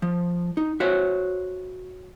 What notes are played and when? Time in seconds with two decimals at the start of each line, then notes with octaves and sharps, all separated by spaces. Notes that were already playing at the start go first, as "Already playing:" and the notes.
0.02 F3
0.57 D#4
0.80 F#4 C5 C#5 E5